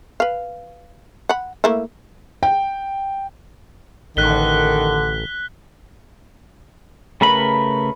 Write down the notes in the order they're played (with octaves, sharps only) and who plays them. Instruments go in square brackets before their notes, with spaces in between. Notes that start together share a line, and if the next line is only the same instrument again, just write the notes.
[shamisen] B4 F5
F#5 B5
A3 A#3 E4
[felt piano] G5
[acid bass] A1 [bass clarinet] D3 [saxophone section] D#3 [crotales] F#6 B6 G7
[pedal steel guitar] C#3 A3 A#4 B4 B5